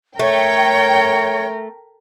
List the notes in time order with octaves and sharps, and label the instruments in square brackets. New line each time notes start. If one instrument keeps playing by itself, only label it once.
[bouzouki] A3 [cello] A#4 [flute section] C#5 [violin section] G5